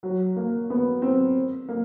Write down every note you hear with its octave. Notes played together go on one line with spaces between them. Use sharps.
F#3
A#3
B3
C4
A#3